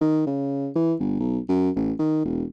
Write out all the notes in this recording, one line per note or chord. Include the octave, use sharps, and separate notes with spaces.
D#3
C#3
E3
G1
B1
F#2
A1
D#3
E1